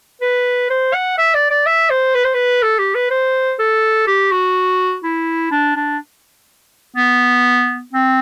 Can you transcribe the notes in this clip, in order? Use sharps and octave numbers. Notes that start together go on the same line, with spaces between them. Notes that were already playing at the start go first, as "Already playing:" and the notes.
B4
C5
F#5
E5
D5
D5
E5
C5
B4
C5
B4
A4
G4
B4
C5
A4
G4
F#4
E4
D4
D4
B3
C4